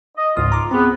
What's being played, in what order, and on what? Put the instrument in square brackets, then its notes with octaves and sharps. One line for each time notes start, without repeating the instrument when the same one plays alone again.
[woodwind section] D#5
[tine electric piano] C#2 G#2 D#6 [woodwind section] F4
[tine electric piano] A#5 D6
[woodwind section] B3 [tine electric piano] C4 G#4